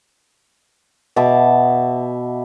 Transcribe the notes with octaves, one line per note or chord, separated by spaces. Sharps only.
B2 E5 A5 D6